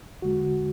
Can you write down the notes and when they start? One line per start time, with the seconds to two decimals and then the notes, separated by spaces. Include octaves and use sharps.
0.22 E2 D3 G#3 F#4